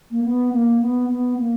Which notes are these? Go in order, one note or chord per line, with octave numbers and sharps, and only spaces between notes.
A#3
B3
A#3
B3
B3
A#3